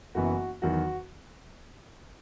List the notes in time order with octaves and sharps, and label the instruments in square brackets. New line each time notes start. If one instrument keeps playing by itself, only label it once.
[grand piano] F#1 F#2 E3 B3 F#4
E2 D#3 F#3 F#4